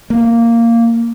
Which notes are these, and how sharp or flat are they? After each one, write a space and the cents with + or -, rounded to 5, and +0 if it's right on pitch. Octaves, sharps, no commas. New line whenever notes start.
A#3 -10